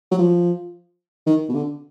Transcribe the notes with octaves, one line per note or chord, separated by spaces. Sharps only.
F#3
F3
D#3
B2
D3